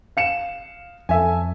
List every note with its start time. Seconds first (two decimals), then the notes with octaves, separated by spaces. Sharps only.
0.17 F5 C#7 E7
1.09 F2 A4 E5 G#5